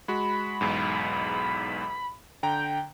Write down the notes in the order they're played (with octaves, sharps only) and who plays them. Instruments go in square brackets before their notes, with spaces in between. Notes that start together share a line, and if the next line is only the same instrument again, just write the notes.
[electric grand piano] G#3 F#4 [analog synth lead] B5
[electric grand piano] B1 E2 G#2
[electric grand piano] D3 A#5 [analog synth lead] G5